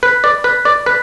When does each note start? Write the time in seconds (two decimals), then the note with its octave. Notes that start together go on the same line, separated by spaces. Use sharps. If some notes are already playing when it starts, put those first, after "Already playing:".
0.03 B4
0.24 D5
0.44 B4
0.65 D5
0.86 B4